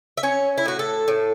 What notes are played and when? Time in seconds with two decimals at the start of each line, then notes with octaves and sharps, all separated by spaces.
0.17 E5
0.23 C#4 C#5
0.58 E4
0.66 A2 F#4
0.79 A4
1.08 A2